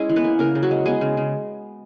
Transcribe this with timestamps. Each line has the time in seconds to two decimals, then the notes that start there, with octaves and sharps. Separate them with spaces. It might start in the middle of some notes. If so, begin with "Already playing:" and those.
Already playing: G#3 C#4 E4 G#4
0.09 E3
0.16 B3 B4
0.24 A#3
0.39 C#3 A#3 A#4
0.55 C#3
0.63 F#3 F#4
0.71 G#3
0.86 G#3 B3 G#4
1.01 C#3
1.17 C#3